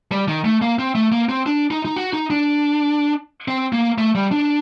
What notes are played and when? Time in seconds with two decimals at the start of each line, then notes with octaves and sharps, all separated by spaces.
0.12 G3
0.28 D#3
0.45 A3
0.62 A#3
0.79 C4
0.95 A3
1.12 A#3
1.29 C4
1.46 D4
1.71 D#4
1.85 D#4
1.96 F#4
2.13 D#4
2.30 D4
3.48 C4
3.73 A#3
3.98 A3
4.15 G3
4.31 D4